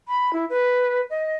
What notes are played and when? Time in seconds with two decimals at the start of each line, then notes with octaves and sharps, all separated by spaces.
0.08 B5
0.33 E4
0.50 B4
1.10 D#5